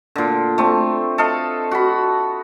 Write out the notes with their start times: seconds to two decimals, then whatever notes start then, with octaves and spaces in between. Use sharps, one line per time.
0.16 A#2 D3
0.58 A3 C4
1.18 A4 D#5 F5
1.71 F#4 B5